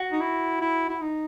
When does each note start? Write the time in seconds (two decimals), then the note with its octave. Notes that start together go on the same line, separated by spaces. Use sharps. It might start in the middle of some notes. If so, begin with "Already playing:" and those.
Already playing: F#4
0.12 D#4
0.20 E4
0.61 E4
0.89 E4
1.02 D#4